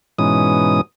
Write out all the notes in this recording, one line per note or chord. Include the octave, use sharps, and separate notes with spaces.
G#2 B2 E3 C#4 D#6